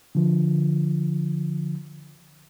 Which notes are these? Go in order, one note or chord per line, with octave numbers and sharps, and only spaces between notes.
D3 F3